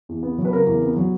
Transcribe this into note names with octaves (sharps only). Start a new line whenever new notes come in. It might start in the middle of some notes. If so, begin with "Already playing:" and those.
E2
B3
F#3
B4
C#3 A#4
E2
B3
F#3